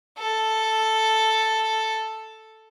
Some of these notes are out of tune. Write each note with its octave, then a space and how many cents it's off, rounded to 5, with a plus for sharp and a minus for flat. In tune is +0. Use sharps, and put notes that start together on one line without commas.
A4 +0